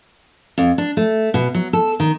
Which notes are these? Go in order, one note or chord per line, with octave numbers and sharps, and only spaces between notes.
F2
D4
A3
B2
F#3
A4
D#3